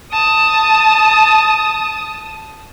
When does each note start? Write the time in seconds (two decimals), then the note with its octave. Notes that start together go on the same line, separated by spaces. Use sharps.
0.13 A5 D#6